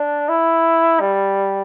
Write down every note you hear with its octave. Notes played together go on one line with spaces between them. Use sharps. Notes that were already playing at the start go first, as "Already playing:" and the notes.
Already playing: D4
E4
G3